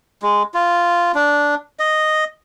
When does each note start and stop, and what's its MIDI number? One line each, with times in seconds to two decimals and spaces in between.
0.22 0.43 56
0.54 1.12 65
1.15 1.55 62
1.79 2.24 75